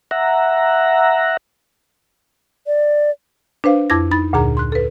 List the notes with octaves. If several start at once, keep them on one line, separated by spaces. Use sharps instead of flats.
E5 F#5 A#5
D5
D4 B4 C5 F5
F2 E4 D6 G#6 A#6
D#4 B5 A6
D2 A#2 D3 G#4 A#5
C6 F#6
A4 B4